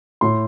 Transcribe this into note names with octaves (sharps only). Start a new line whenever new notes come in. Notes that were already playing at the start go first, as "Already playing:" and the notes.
A2 C6